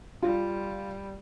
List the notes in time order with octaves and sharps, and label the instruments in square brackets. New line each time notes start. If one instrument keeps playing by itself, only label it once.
[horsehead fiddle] G3 [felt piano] F4